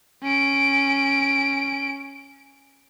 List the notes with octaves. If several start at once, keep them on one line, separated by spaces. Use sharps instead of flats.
C#4 D7